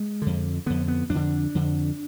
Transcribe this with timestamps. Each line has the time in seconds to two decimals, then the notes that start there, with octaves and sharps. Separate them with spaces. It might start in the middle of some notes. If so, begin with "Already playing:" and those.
Already playing: G#3
0.22 F2 D3
0.66 F2 D3 B3
0.88 B3
1.10 F2 D4
1.15 D3
1.55 F2 D3